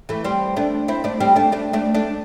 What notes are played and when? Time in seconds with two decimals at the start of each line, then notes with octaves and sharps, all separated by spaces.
0.09 E3 A3
0.24 G3 C4
0.56 A3 D4
0.88 C4 E4
1.04 A3 D4
1.20 G3 C4
1.36 A3 D4
1.52 A3 D4
1.73 A3 D4
1.94 A3 D4